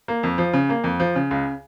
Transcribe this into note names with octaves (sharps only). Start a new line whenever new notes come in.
A#3
F2
F3
C#3
A#3
F2
F3
C#3
C#2